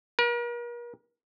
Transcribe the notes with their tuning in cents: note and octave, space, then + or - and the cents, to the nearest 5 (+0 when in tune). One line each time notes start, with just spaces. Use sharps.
A#4 +40